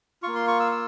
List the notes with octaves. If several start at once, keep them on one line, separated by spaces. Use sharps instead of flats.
A#3 F4 C#6
C6
C#6
E6
E6